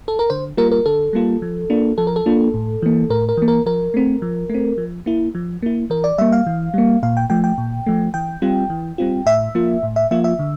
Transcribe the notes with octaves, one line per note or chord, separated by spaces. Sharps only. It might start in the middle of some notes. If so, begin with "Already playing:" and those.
A4
A#4
D3 C5
G3 A#3 F4 A#4
A#4
D3 A4
G3 A#3 F4
F3
A#3 D4 F4
F3 A4
A#4
A4
A#3 D4 F4
A2
E3 A#3
A2 A#4
A#4
E3 A#3
A#4
F3 A#4
A3 C4
F3
A3 C4
F3
A#3 E4
F3
A#3 E4
E3 A#4
D5
G3 A#3 E5
F5
E3
G3 A#3
A#2 F5
G5
F3 A3 G5
G5
A#2
F3 A3
E3 G5
G3 C4 F4
E3
G3 C4 F4
A2 E5
F3 A#3 F4
A2
E5
F3 A#3 F4 E5
E5
D3